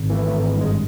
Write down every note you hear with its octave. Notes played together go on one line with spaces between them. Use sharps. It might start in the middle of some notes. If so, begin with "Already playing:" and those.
Already playing: G#1
E3 A3
A3
G#1
G#3
G2
G#3